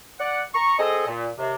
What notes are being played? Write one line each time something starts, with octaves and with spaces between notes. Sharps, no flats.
D5 F#5
A#5 C#6
C4 G#4 A4 D#5
A#2
D#2 C3